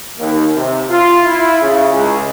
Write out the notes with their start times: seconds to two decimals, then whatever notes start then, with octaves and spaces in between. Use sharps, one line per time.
0.19 D#2
0.55 C3
0.90 F4
1.25 E4
1.62 C#3
1.94 C#2